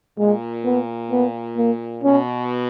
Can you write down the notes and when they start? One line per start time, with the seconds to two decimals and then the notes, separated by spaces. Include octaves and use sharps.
0.18 A#2 G#3
0.65 B3
1.11 B3
1.57 A#3
2.04 B2 C#4